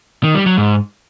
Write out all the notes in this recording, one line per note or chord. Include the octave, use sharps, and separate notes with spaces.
D#3
G3
F#3
G#2